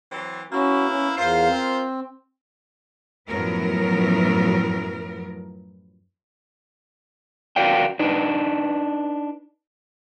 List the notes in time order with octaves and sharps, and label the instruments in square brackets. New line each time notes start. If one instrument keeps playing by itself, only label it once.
[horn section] E3 F#3 C4
[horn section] A#3 B3 E4 [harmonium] C#4 F#4
[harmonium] C#4
[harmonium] E2 F5 [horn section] F4 A#4 C5
[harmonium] C4
[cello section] F#2 A2 F3 F#3 B3 A#4
[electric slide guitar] F#4 A#4 D5 F5 G5
D4 D#4 B4